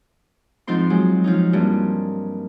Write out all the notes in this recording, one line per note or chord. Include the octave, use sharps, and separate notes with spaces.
G#2 F3 C4 D#4 C6
F#3 G#3
F3 C#4 D#4
G2 A#3 C4